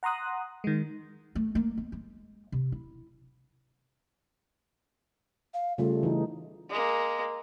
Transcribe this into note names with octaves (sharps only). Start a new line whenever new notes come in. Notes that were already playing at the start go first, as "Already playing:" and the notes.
F#5 A#5 C6 D#6 F#6
D#3 G#3
A3
A#3
B3
G#3
C3
E4
F5
C#3 G3 A3 F4
E3 D#4
G#3 A#3